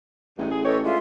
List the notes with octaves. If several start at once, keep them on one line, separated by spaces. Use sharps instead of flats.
A1 G2 G#3 A3
G#4
G4 A4 B4 C#5 D#5
D3 G#3 F4 E5 C6